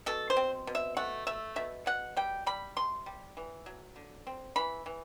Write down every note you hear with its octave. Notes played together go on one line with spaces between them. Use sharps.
B2 A4
C5
C4
B2
E5
A3 F#5
A3 E5
B2 E5
B2 F#5
G3 G5
G3 B5
C3 C6
G3
E3
F#3
D3
C4
E3 B5
E3